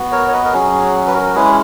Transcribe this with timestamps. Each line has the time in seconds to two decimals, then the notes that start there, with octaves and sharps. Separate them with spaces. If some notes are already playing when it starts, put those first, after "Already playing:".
Already playing: B3 F#4
0.12 A#4 C#5
0.28 C#5
0.32 B4 D#5
0.45 A#4
0.53 F#3 C#4 F#4 G#4
1.07 B4
1.14 F#4 A#4
1.35 G#3 C#4 E4 G#4 B4